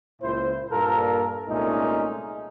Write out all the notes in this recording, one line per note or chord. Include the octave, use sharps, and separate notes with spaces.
C#2 A#2 E4 C5
G2 A#2 A#3 A4 A#4
C2 A#2 G#3 A3 C#4 D#4